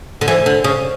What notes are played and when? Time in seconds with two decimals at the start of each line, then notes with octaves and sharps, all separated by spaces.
0.21 D3
0.28 E3
0.46 D3
0.64 C#3